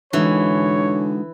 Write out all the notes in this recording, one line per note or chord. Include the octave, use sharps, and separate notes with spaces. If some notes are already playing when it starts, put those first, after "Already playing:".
D3 E3 G#3 D#4 F#4 C#5